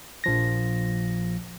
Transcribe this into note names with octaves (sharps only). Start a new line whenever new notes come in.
A#1 F3 A#6